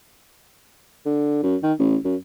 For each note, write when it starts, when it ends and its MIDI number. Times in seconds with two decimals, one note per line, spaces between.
1.06 1.41 50
1.43 1.56 42
1.63 1.73 51
1.79 1.96 33
2.05 2.16 42